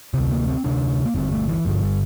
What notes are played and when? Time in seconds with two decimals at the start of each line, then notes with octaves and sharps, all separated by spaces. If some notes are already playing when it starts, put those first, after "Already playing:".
0.14 D2 C3 C4
0.31 A#3
0.48 C4
0.64 D2 C3 D4
1.05 A#3
1.15 G1 G2 D3 C4
1.32 A3
1.48 E3
1.65 G1 G2 D3 F3
1.83 G3